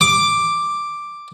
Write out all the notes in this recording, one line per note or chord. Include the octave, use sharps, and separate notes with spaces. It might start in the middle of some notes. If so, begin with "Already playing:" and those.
D6